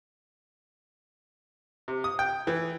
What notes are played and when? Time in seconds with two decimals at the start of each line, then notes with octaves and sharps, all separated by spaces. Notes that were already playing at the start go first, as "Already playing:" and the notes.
1.88 C3
2.04 D#6
2.19 G5
2.47 E3